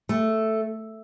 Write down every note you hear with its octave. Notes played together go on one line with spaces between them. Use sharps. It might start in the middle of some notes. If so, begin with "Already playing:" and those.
A3